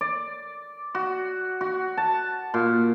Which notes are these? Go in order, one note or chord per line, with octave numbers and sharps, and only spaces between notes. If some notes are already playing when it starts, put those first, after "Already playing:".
D5
F#4
F#4
A5
A#2